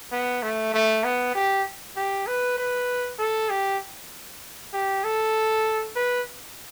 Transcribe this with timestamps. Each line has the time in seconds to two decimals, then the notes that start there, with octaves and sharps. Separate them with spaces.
0.12 B3
0.43 A3
0.73 A3
1.04 B3
1.35 G4
1.96 G4
2.27 B4
2.58 B4
3.19 A4
3.50 G4
4.73 G4
5.04 A4
5.96 B4